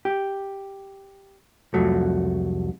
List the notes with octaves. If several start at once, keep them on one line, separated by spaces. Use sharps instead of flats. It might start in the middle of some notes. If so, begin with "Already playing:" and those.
G4
C2 F2 F#3 A3